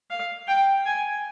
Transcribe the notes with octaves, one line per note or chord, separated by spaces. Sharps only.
F5
G5
G#5